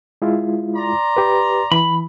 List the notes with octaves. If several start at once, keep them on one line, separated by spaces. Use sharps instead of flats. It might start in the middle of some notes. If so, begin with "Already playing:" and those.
G#3 E4 F4
D5 A#5 C6
G4 B4
E3 B5